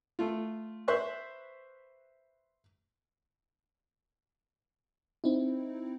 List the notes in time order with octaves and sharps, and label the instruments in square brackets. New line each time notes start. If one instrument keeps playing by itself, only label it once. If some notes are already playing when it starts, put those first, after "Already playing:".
[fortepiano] A3 F4
B4 C5 E5 C6 C#6 F#6
[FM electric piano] C4 D#4 E4